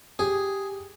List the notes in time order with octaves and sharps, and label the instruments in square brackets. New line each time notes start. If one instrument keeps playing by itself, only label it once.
[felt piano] G4 [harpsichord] G#4